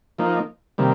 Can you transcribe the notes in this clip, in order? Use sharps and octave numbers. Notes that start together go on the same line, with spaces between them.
F3 A#3 D#4
C3 D#3 G3 A#3